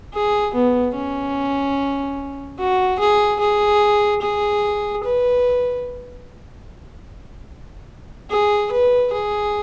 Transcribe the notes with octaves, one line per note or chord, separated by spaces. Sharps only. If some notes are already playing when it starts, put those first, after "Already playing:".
G#4
B3
C#4
F#4
G#4
G#4
G#4
B4
G#4
B4
G#4